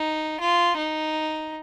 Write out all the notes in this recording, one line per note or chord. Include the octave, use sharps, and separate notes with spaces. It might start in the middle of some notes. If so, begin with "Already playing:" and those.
Already playing: D#4
F4
D#4